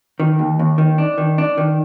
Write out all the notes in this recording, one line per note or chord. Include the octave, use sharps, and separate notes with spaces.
D#3
D#2
D#2
D#3
D4
D#3
D4
D#3